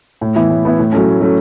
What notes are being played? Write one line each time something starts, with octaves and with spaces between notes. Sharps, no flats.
A2
E3 B3 E4
A2
E3 B3 E4
A2
F#3 A3 C#4
A2
F#3 A3 C#4